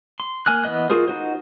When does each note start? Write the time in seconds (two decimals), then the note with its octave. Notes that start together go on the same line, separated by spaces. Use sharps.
0.20 C6
0.46 A#3 G#5 F6 F#6
0.64 E3 B3 D#5 F#6
0.90 F4 F#4 G#4 A#4 C5
1.08 D#4 F#4 C5